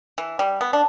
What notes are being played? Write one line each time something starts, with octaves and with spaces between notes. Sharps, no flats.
E3
G3
B3
D4